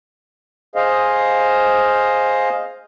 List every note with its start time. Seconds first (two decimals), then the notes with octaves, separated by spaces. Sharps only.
0.75 G#4 C5 D#5 F5